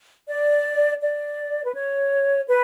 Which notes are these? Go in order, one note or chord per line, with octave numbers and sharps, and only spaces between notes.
D5
D5
B4
C#5
B4